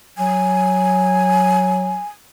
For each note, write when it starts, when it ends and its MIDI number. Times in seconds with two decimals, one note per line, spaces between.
0.18 1.99 54
0.18 2.06 80